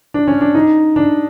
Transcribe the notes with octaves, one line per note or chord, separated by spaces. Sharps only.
D4
C#4
D4
D#4
D4